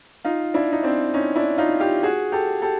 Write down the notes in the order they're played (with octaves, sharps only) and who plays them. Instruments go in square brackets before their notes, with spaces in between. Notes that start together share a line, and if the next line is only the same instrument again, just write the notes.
[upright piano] D#4 F4
D4 E4
D#4
C4 D4
C#4 D#4
D4 E4
D#4 F4
F4 G4
F#4 G#4
G4 A4
G4 A4